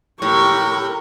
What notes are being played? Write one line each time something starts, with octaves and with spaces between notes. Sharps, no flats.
A2 G4 A#4 C#6